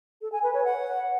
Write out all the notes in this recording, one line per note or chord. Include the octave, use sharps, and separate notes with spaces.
A4
G#5
B4
C#5
F#5